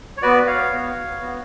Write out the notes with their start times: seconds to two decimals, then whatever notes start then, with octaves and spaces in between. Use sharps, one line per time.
0.17 C#5
0.22 B3 F#4 B4 D5
0.47 C#5 F5
0.72 B3 F#4
1.20 B3 F#4